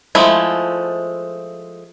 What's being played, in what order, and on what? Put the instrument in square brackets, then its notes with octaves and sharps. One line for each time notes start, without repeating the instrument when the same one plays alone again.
[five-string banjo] F3 G#3 A3 E4